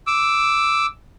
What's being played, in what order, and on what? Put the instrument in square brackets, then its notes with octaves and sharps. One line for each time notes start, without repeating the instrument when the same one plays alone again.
[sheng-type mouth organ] D6 E6